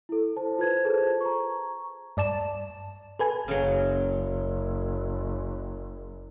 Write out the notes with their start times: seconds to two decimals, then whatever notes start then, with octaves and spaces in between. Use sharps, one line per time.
0.09 E4 A4
0.36 C5 A5
0.59 F4 B4 C5 G#6
0.85 G#4 A4 B4 C5 A5
1.21 A#5 C#6
2.17 G2 D5 A5 E7
3.19 A4 B4 G#5
3.48 F#1 C#3 F#3